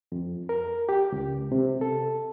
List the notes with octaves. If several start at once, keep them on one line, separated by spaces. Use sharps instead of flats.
F2
A#4
G4
C#2
C3
A4